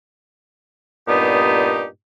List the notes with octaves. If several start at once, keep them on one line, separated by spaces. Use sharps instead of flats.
G2 A#2 B3 D#4 G4